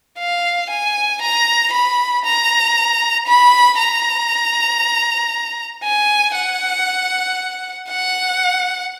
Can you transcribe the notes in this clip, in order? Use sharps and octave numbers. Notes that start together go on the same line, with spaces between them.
F5
G#5
A#5
B5
A#5
B5
A#5
G#5
F#5
F#5